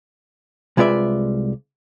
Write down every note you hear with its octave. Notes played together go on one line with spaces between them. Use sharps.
C2 G#3 F4 B4 D5 E5